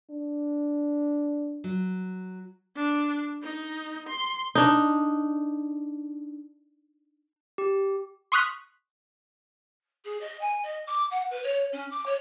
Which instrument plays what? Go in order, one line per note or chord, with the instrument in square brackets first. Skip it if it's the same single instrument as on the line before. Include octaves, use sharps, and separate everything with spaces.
[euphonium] D4
[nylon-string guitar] F#3
[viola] D4
D#4
C6
[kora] D4 D#4
[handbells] G4
[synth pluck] C6 C#6 D#6 F6 F#6 B6
[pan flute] G#4
D#5
G#5
D#5
D6
F#5
B4
C#5
C#4
D6
C#5